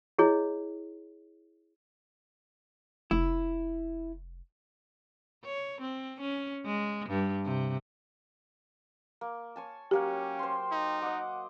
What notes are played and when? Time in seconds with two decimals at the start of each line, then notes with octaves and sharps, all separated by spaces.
0.18 E4 G#4 C#5 D#5
3.11 F1 E4
5.45 C#5
5.81 C4
6.21 C#4
6.65 G#3
7.09 G2
7.45 C3
9.21 A#3
9.56 C#5 G#5 A5
9.91 F#3 A#3 C#4 G4 F#5 G5
10.39 C5 C6
10.71 D#4
11.02 D#5 F#5 D6